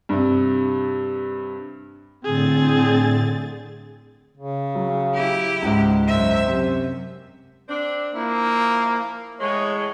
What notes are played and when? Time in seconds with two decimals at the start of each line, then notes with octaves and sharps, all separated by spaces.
0.09 G2 C3
2.25 A2 D3 C4 G#4 A6
4.38 C#3
4.75 F#3
5.13 E4 G4
5.62 C#2 G#2
6.07 F#2 C5 E5
6.46 F#2 C3
7.68 C4 D4
8.15 F3 A#3 E4
9.40 A2 E3 G#3 C#5